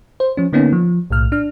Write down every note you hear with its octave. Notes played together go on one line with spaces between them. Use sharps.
C5
F3 C#4
D3 A#3 B3 C#4 D#4
F3
B1 A2 F6
D4 F6